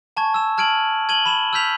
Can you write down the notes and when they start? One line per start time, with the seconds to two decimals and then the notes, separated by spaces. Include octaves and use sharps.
0.17 G#5 A5 C#6 G#6
0.34 E6 E7
0.58 A5 F6 G#6 D7 D#7 F#7
1.09 G#6 D#7 F#7 G7
1.26 B5 E7
1.53 E6 F6 G6 B6 F7